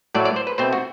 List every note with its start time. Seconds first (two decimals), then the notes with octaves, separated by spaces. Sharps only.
0.15 A2 F#3 A3 D5
0.25 D5
0.36 C5
0.47 B4
0.58 B2 A3 C4 C5
0.73 F#4